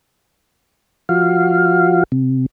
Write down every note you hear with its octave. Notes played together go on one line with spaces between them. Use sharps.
F3 F#4 F5
C3